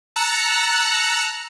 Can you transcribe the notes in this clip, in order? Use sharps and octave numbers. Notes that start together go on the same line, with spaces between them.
A5 A#5 E6 F#6 C#7